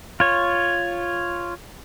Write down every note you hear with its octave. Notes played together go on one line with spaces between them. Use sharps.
F4 C#5